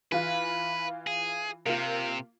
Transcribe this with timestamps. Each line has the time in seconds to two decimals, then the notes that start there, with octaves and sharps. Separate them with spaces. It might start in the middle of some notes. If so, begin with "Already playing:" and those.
0.12 E3 F4 B4
1.07 G#4
1.66 C3 A#3 F4